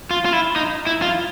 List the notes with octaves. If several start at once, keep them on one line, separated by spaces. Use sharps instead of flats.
F4
F4
E4
D#4
E4
F4